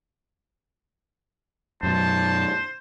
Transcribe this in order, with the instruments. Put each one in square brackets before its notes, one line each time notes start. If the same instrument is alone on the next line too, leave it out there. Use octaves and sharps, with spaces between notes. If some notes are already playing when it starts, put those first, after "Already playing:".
[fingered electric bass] F#2 B2 [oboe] C5 [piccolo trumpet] A5